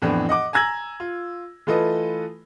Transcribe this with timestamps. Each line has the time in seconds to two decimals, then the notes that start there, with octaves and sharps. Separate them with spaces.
0.02 F2 A2 E3 F3 B3 D4
0.29 D#5 F#5 D6
0.53 G#5 A#5 E6 G#6 A#6 F#7
1.00 F4
1.67 E3 A3 F4 A4 B4 D#5